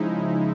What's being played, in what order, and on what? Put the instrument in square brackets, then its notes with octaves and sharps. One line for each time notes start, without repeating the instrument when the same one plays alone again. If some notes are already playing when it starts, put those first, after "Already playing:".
Already playing: [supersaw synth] C#3 F3 G#3 D#4 E4